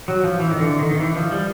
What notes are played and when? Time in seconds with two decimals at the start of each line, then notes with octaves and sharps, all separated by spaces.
0.08 F#3
0.24 F3
0.40 E3
0.51 D#3
0.60 D3
0.80 D#3
0.91 D#3
1.00 E3
1.16 F3
1.31 G3